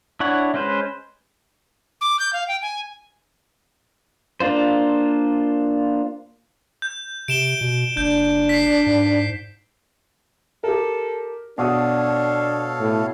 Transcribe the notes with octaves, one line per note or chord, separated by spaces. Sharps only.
D4 E4 C#5 F#5
G#3 C#4 B4 C5
D6
G6
F5
G5
G#5
A#3 D4 F4 C5
G6
C3 D7 E7 G7
B2
F#1 D4 G6
B6 C7
G#2
G4 A4 A#4
B2 D4 F#4 A4 C#5 F5 D#6
A2